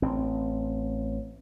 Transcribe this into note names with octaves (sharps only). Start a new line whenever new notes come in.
A1 C4